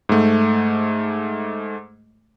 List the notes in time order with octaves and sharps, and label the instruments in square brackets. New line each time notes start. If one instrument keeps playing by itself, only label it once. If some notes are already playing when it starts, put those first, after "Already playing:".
[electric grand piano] G#2 A3